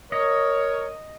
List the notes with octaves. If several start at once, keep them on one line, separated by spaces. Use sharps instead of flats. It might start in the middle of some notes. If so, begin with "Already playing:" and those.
A#4 C#5 D#5